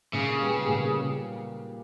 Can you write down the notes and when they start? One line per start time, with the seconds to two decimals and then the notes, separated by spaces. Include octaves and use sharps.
0.13 A#2 C#3
0.41 G3 B3
0.68 A#2